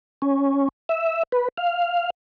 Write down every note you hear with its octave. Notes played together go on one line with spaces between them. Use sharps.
C#4
E5
B4
F5